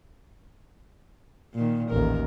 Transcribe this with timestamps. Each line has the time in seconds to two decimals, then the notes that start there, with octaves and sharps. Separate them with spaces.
1.54 A#2 D#3
1.89 A1 D#2 A#4